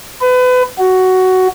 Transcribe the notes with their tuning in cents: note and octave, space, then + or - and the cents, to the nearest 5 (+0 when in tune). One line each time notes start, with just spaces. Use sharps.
B4 +30
F#4 +10